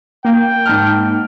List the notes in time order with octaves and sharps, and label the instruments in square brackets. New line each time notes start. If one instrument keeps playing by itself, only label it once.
[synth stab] A#3 [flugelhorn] G5
[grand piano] G#2 A5 F6